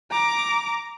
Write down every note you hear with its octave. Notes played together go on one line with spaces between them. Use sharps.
A#5 D6